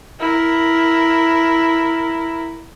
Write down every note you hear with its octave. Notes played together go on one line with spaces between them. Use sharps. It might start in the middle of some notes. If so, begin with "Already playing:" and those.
E4 A#4